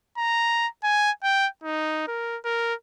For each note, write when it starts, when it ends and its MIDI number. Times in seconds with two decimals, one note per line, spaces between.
0.18 0.67 82
0.84 1.11 80
1.23 1.48 79
1.64 2.07 63
2.08 2.38 70
2.45 2.74 70